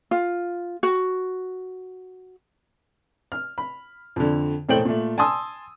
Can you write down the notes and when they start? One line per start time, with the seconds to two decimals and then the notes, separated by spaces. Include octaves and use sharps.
0.11 F4
0.83 F#4
3.32 F6
3.58 B5
4.16 F2 D3
4.69 E1 A2 A4 C5 G5 F#7
4.85 A#2 A3
5.18 G#5 A5 C6 D#6 E6